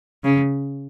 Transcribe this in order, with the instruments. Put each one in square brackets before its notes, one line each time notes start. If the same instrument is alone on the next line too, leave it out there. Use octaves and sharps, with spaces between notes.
[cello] C#3